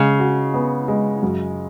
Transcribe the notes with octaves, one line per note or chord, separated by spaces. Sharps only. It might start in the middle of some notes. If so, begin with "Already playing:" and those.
Already playing: C#3 G#3
F#4
B3
G#3
F#2